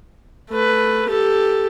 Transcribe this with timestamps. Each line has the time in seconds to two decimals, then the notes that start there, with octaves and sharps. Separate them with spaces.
0.50 A3 B4
1.09 G4 A4